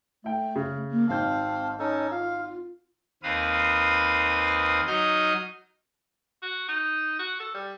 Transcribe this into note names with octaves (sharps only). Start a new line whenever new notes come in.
A3 E4 G5
C#3
A#3
G#1 C4 F5 A5 G6
C#4 D#4 A4
F4 F5
D#2 C4 B4 F5 D#6
F#3 D#4 D#6 F6 G6
F#4
D#4
F#4
A4
G3